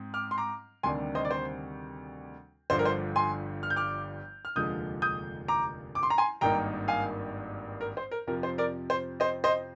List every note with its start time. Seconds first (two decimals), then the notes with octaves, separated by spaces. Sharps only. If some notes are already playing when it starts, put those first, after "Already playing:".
Already playing: G#2 C4
0.14 D6 F6
0.31 C6
0.38 A#5 D6
0.83 D2 C3 D#3 G3 D4 G#5 C6
1.15 C5 D#5
1.25 D5
1.31 C5
2.70 G1 G2 D3 F3 C5
2.79 A#4
2.85 C5
3.16 G#5 C6
3.63 F6
3.70 G6
3.76 D6 F6
4.45 F6
4.56 F1 D#2 D3 F3 G#3 D#6 G6
5.02 D#6 G6
5.48 A#5 D6
5.95 D6
6.03 C6
6.10 A#5
6.18 G#5 C6
6.41 G#1 G2 D#3 A#3 D#4 G5 A#5
6.88 F5 G#5
7.81 A#4
7.97 C5
8.11 A#4
8.27 F2 C3 F3 A#4
8.43 C5
8.58 A#4 D5
8.90 C5
9.20 C5 D#5
9.44 C5 D#5